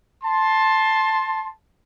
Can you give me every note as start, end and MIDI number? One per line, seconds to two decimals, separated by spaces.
0.24 1.50 81
0.24 1.50 84